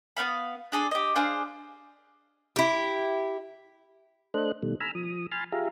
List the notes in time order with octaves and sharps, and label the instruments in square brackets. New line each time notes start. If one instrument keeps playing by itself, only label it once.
[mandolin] B3 C4 F5 B5
D4 G#4 A4
G4 D#5
D4 G#4 C5 F5
[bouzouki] E4 G4
[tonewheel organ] A3 D4 A4 C5 D#5 F#6
B2 D#3 G3 A3
G#5 A#5 B5 E6 F6
F3 D#6
G#5 B5 C6 F6 A6
F4 G4 G#4 E5 F5 A#5